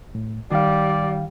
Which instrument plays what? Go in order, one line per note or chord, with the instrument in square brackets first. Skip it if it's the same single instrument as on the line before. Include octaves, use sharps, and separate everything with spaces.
[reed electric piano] A2
[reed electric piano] D#3 F5 [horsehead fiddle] G3 [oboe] D5